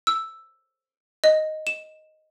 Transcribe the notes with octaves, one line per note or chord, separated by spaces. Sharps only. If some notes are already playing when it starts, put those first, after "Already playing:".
E6
D#5
E7